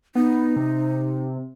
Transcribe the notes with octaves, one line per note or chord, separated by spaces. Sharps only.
B3 D#4
C3